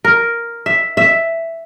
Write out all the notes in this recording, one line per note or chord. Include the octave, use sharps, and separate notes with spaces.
A#4
E5
E5